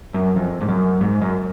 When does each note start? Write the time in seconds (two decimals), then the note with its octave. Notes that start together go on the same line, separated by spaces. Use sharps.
0.14 F#2
0.36 F2
0.61 G#2
0.69 F#2
1.01 G#2
1.21 F#2